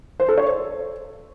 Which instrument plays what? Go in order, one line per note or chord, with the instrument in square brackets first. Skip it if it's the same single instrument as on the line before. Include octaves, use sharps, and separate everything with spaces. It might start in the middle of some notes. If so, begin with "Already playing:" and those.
[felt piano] C5
A4
C#5
C5